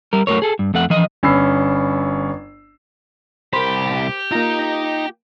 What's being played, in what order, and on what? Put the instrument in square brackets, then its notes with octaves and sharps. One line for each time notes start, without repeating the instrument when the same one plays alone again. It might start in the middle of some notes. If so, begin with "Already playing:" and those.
[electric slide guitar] G3 A#4
F#3 A3 A#4 C#5
G#4 A4
G2
F2 A3 F#5
E3 F3 D#5
[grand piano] G1 C#4 B5 E6 C7
[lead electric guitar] C2 B5 [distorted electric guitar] G4 [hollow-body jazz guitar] A#4 C5
[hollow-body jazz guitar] A#3 F4 [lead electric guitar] D#4 A#5